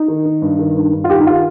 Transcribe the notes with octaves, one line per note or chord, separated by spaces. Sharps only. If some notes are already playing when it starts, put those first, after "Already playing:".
Already playing: D#4
D#3
D#3
G2
D#3
G2
G2
F4
D#3 G4
D#4
D#3 F4